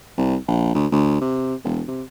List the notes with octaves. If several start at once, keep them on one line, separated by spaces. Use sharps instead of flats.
C2
A#1
D2
D2
C3
E1
C3